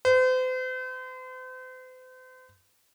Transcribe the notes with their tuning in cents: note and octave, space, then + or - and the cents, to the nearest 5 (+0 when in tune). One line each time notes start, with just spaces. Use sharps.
C5 -40